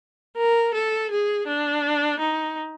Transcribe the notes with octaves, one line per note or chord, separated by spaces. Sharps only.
A#4
A4
G#4
D4
D#4